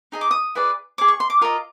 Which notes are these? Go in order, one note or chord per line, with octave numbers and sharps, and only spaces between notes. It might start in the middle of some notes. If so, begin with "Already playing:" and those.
D#4 G#4 D#5
D6
D#6
E4 G#4 B4 D5
G#4 C#5 D6
C#6
C6
D6
F4 A#4 D#5